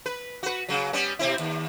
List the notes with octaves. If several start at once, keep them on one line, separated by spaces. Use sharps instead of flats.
B4
F#4 B4
C#3 F#3
G3 B3 C#4
B2 C4 E4
D#2